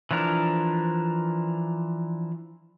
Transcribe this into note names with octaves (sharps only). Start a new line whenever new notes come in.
E3 F3 D4 A#4